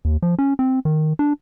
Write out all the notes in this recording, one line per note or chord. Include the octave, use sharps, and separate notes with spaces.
D#2
F3
C#4
C4
D#3
D4